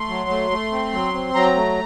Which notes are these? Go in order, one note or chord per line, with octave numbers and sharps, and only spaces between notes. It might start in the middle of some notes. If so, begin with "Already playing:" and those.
Already playing: A3 C6
F#3
A3
A3
C4
F#3
C4
F#3 A#5
A3